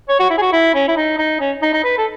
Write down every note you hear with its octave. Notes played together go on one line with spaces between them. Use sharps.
C#5
F#4
E4
G#4
F#4
E4
C#4
E4
D#4
D#4
C#4
D#4
D#4
B4
A4